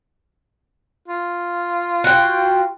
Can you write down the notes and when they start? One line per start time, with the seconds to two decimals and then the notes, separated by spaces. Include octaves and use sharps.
1.08 F4
2.04 F#4 G5